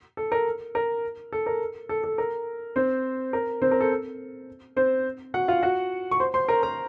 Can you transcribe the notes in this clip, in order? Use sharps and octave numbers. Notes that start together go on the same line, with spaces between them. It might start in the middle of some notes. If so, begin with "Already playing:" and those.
A4
A#4
A#4
A4
A#4
A4
A4
A#4
C4 C5
A#4
C4 C5
A#4
A4
C4 C5
F#4 F#5
F4 F5
F#4 F#5
C#6
C5 C6
C5 C6
A#4 A#5
A#4 A#5